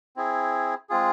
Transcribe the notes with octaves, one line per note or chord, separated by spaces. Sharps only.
C4 E4 G#4
G#3 C4 F4 G#4